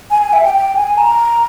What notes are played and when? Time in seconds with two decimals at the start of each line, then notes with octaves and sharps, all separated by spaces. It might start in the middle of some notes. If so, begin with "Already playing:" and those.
0.11 G#5
0.22 G#5
0.33 E5
0.43 G5
0.54 G5
0.75 G#5
0.98 A#5